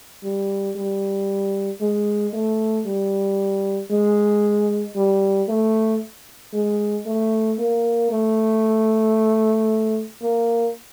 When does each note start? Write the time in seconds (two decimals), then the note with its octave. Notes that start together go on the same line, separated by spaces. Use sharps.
0.24 G3
0.76 G3
1.81 G#3
2.33 A3
2.86 G3
3.91 G#3
4.96 G3
5.49 A3
6.53 G#3
7.06 A3
7.59 A#3
8.11 A3
10.21 A#3